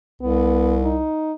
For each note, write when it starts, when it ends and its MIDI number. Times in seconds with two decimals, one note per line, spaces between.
0.22 1.04 36
0.22 0.77 59
0.83 1.33 63